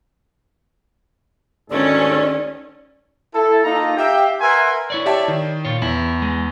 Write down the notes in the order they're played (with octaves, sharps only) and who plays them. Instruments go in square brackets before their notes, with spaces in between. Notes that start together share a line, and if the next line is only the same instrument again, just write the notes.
[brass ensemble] D2 G#2 A4 [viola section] D#3 C#4 [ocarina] D5
[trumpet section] E4 A4
A#3 D#4 F4 A4 A#5
G4 E5 F5 G5
A#4 B4 E5 F#5 G#5 C6
[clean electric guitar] E4 C#5 D5
[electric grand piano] G4 E5 A5
D#3
[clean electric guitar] A#2 F4 C#5
[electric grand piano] E2 [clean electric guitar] E4
[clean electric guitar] G#3